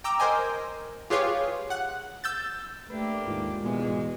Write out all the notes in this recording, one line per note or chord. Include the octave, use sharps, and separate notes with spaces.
G5 A#5 D6 E6
A#4 C5 D#5 G#5
F4 G4 G#4 B4 C#5 F5
F#5 F#6
E6 G6 A6
A3 A#3 D4 G4 B4
D#2 G#2 F4
E2 B2 E3 G#3